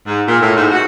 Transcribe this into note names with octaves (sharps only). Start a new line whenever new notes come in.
G#2
A#2
A2
G#2
F#4